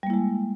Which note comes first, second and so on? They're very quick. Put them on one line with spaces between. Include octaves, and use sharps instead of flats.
G3 A#3 E4 G#3